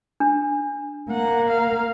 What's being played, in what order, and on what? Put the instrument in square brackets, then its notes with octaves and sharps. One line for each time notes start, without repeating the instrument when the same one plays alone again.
[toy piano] D4
[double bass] A#3 [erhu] F#5
[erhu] F5